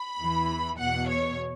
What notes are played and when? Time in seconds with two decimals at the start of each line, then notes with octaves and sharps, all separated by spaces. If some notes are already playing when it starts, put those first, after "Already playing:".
Already playing: B5
0.19 E2 E3
0.78 E2 B2 F#5
1.08 C#5